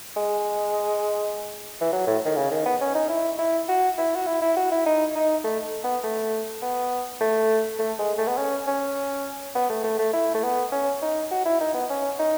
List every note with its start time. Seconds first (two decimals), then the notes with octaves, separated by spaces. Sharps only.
0.17 G#3
1.81 E3
1.92 F#3
2.07 A2
2.25 D#3
2.36 C#3
2.51 D#3
2.66 B3
2.81 C#4
2.95 D#4
3.09 E4
3.38 E4
3.69 F#4
3.98 E4
4.16 F#4
4.27 E4
4.42 E4
4.57 F#4
4.71 E4
4.86 D#4
5.16 D#4
5.44 A3
5.84 B3
6.04 A3
6.62 B3
7.21 A3
7.79 A3
7.99 G#3
8.18 A3
8.28 B3
8.38 C#4
8.67 C#4
9.55 B3
9.70 A3
9.84 A3
9.99 A3
10.13 E4
10.34 A3
10.43 B3
10.72 C#4
11.02 D#4
11.31 F#4
11.45 E4
11.60 D#4
11.74 B3
11.90 C#4
12.19 D#4